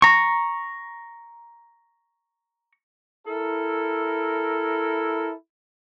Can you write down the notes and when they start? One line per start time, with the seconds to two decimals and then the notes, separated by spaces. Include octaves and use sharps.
0.02 A#5 C#6
3.26 E4 A4 A#4